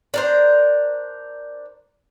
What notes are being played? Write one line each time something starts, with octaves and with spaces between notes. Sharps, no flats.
D4 A#4 C5